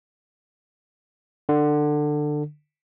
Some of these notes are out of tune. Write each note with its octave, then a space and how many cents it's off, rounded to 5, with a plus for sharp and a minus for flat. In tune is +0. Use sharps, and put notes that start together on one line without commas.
D3 +20